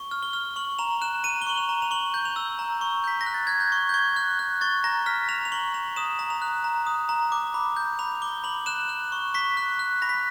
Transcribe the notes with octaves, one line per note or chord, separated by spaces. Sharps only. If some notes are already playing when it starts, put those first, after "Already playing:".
Already playing: C#6
F6
G7
F6
C#6 F#7
A#5 F7
F#6 E7
A#5 D#7
G7
C#6 F#7
F7
A#5
F7
C#6 F#7
G6
F7
E6
A#5
C#6
G6 B6
A#6
F#6
A6
F#6 G#6
G6
C#6
G6
C#6 G#6
F#6
F#6
C#6 A6
A#5 A#6
F6 B6
A#5 F7
F7
C#6 F#7
A#5 F7
D#6 E7
A#5
F7
F#6
A#5
D#6
A#5
D6
B5
G6
B5 F7
D6 G7
B5 F#7
F#6 E7
F#6
C#6
C#6 B6
F#6
F#6
B5 A#6
B6